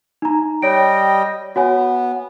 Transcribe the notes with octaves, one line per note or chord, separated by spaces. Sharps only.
D#4 A#5
G3 C#5 D#5 G5 D7
B3 F#4 C#5 G#5